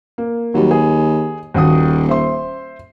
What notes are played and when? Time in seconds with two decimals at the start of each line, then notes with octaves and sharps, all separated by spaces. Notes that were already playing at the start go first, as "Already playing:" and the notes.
0.18 A#3
0.54 D#2 F#3 G3
0.71 G#4
1.54 D#1 D#2 F#4 D#6
2.09 C5 E5 C6